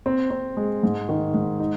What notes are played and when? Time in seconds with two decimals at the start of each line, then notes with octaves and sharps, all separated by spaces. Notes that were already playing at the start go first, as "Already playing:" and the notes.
0.06 C4
0.31 C4
0.57 G#3
0.83 G#2
1.09 D#3
1.34 G#2
1.60 D#4